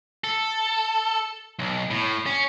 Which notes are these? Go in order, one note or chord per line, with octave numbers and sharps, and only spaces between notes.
A4
B1
A2
C#4